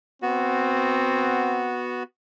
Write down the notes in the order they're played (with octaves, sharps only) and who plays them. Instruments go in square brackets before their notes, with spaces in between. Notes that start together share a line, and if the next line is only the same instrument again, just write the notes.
[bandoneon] B3 F#4 [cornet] C4